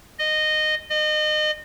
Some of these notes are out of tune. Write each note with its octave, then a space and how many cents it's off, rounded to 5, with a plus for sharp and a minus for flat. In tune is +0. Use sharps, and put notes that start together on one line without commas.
D#5 -15
D#5 -30